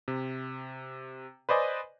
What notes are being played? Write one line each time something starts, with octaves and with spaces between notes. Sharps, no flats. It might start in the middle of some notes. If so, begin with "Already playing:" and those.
C3
B4 C5 D5 D#5 G#5